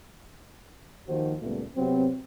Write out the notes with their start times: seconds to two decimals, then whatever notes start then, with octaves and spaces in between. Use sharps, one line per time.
1.07 D#2 D#3 F3 F#4 C5
1.41 C#2 A#2 G3 A3 B3
1.76 C3 F#3 B3 C4